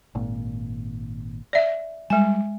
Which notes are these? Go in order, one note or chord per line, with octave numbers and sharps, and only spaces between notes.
G#1 A#2
D5 E5
G3 G#3 G#5